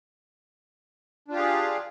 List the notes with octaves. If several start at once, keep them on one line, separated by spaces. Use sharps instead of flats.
D4 F4 G4 G#4 F5